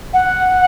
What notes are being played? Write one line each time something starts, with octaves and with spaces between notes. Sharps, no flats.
F#5